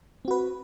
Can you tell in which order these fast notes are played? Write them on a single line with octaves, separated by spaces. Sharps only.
C4 F#4 B4